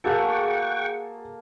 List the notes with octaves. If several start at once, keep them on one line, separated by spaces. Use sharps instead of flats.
A#3 F#4 G#4 A4 F#5 G5 C#6